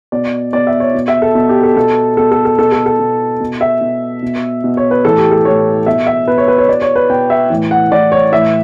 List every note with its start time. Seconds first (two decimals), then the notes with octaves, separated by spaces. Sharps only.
0.12 B2 D5
0.53 B2 D5
0.67 E5
0.80 C#5
0.95 B2
1.08 E5
1.22 A4
1.35 B2
1.49 G4
1.63 A4
1.77 B2 A4
2.17 B2 A4
2.32 A4
2.45 A4
2.59 B2 A4
2.72 A4
2.86 A4
2.99 B2
3.40 B2
3.61 E5
3.81 B2
4.22 B2
4.64 B2
4.77 C#5
4.91 B4
5.05 A2 E3 A4
5.18 G4
5.32 A4
5.45 A2 E3 C#5
5.86 B2 E5
6.07 E5
6.27 B2 B4
6.38 C#5
6.48 B4
6.58 C#5
6.69 B2 D5
6.82 C#5
6.95 B4
7.10 B2 G5
7.30 E5
7.50 A2 E3
7.71 F#5
7.91 A2 E3 D5
8.12 C#5
8.32 A2 E3 E5